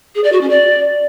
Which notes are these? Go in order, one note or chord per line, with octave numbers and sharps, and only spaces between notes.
G#4
D5
F#4
C#4
D5